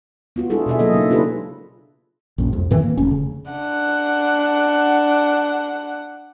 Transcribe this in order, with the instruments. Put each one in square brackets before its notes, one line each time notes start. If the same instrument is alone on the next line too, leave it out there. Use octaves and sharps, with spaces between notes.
[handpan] B3 F4 F#4
G#3 D4 E4 F4 G#4 A4
B2 B3 G#4 E5
F#3 A#3 A4 D#5
C#3 D#4
D4 F4 G4 A4 B4
[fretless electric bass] A#1 F#2
C2 F2
A2 D#3 E3 C4
A#3
F1 C#4
C#3
[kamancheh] D4 F#5